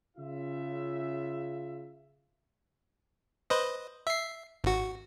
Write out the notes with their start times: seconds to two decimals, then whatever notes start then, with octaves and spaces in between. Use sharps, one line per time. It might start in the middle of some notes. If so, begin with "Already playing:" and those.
0.17 C#3 F4 E5
3.50 B4 C5 D#5
4.07 E5 C7
4.64 G#1 F#4